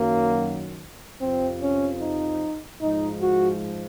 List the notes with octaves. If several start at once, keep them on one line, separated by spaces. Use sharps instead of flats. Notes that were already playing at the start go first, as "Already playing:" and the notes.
Already playing: F#2 D#3 F#3 A#3
F2 C3 F3 C4
C#4
D#4
G#2 F3 G#3 D#4
F#4